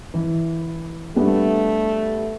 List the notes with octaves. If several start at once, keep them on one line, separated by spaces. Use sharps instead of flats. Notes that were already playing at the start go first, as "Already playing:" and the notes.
E3
G3 A3 B3 D4